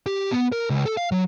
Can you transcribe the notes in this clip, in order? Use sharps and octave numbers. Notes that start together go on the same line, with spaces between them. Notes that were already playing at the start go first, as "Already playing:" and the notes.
G4
B3
A#4
C#2
A4
F5
F#3